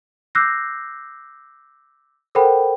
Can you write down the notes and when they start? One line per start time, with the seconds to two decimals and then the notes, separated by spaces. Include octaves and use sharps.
0.35 D6 E6 F#6 G6 A#6 C7
2.35 A4 A#4 C5 F#5 G5 B5